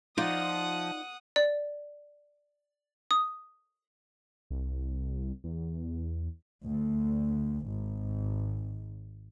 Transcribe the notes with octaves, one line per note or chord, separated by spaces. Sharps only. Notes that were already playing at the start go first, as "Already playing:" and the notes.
F3 D#4 F4 D5 F#5 D#6
D5
D#6
C2
E2
D2
G#1